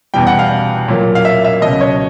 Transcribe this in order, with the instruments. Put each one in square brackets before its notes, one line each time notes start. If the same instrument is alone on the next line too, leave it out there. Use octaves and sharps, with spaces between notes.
[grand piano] E2 B2 G3 G5
F#5
F5
A#2 F#3 A#3
F5
E5
E5
C#2 B2 F#3 D#5
C#5